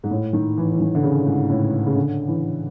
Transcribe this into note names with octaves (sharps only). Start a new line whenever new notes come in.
G#2
A2
D#3
E3
E3
D#3
D3
C#3
G#2
A2
C#3
D3
E3